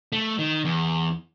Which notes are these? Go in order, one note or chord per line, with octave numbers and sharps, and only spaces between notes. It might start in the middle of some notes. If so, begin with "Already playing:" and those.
A3
D#3
E2